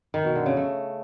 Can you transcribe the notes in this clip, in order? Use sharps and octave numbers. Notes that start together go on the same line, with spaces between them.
D#3
B2
D3
C#3
A3